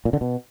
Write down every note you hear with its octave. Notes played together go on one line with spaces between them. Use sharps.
A#2
D3
B2